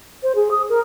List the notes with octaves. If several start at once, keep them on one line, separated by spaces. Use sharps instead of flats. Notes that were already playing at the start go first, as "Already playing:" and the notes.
C5
G#4
D#6
A#4